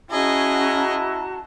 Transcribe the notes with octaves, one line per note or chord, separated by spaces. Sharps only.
C#4 E4 F#4 G#4 D#5 A5 A#5